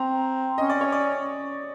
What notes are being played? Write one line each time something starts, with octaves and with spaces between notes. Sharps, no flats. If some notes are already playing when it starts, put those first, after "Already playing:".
Already playing: C4 A#5
C#4 D#5
D5
C#5
D5